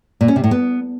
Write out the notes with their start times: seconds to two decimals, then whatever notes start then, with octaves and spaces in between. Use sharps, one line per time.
0.21 A#2
0.28 C#4
0.36 C3
0.44 A2
0.51 B3